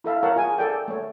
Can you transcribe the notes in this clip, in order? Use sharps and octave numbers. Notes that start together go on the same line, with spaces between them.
E4 A4 E5 F5
A#4 C#5 F5 F#5 A5
F4 G#4 G#5
A4 D5 G5
A3 C#5